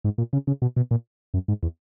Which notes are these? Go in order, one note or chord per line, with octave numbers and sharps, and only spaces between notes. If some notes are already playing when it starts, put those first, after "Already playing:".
G#2
A#2
C#3
C#3
B2
B2
A#2
F#2
G#2
E2